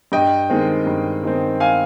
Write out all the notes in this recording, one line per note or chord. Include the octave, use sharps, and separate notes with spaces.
G2 D#5 G5
D#3 G#3 C4
G2
D#3 G#3 C4
F5 G#5